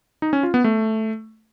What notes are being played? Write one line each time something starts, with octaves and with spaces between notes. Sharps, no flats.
D#4
C#4
F4
B3
A3